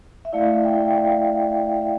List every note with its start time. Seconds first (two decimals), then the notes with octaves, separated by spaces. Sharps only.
0.25 E5
0.33 A3 E4 D5 F5
0.64 E5 G5
0.95 D5 F5
1.73 F5
1.82 E5